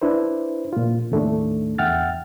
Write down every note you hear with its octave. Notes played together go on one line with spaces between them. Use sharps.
D4 E4 B4 C5
A#2 F4
D#2 A2 A3 D4
E2 E5 F#5 G5 F6 A6